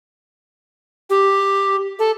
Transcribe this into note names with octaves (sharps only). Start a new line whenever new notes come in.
G4
A4